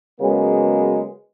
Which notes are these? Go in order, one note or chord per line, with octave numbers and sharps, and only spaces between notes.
C#3 F#3 G#3 A#3 B3